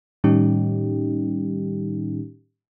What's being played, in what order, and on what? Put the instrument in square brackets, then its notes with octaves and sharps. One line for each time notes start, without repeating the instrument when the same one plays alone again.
[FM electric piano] A2 D#3 G3 C#4 D#4 G4